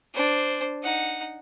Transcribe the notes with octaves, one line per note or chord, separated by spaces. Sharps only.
D4 C5
D#4 F#5